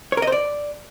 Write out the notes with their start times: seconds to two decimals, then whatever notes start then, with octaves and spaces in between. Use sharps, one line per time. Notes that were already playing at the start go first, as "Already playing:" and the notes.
0.12 C#5
0.17 A#4
0.22 D#5
0.27 C5
0.32 D5